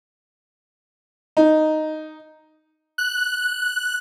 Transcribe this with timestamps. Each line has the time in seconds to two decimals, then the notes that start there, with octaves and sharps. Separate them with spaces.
1.37 D#4
2.98 F#6